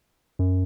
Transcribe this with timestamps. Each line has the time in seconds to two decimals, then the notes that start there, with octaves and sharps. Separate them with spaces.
0.39 F#2